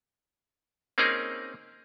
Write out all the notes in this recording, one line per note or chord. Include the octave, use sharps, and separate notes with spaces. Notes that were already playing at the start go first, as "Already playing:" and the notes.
A#3 C4 C#4 D#4 G#4 A#4